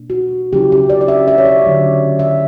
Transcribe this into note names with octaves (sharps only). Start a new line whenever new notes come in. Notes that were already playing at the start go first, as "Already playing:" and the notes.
Already playing: B2 A#3 D4
F#4
C#3 F#3 C#4 E4 G4
G4
D5
D5
E5
E5
C#5
D5
D3 F#3 C#4
E5